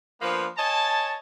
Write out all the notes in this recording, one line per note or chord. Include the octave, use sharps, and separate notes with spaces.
F3 A#3 B3 D4 B4 C5
C#5 D#5 G#5 A5